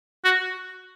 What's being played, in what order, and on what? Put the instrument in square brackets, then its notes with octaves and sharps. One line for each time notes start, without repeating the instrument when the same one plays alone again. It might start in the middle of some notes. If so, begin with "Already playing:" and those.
[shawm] F#4